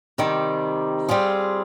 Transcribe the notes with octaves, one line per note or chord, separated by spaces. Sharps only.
C3 D#3 G3
G3 C4 F4 G#4